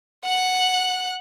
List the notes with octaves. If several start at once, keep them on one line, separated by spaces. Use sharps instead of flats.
F#5 F#6